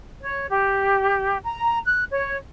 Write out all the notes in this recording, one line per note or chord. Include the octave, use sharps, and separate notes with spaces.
C#5
G4
A#5
F#6
C#5